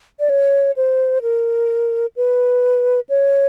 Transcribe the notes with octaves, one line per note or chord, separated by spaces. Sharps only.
D5
C#5
C5
A#4
B4
C#5